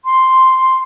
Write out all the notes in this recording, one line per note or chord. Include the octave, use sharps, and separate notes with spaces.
C6